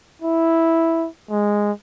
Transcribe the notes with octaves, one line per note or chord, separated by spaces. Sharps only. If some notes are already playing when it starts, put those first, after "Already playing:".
E4
G#3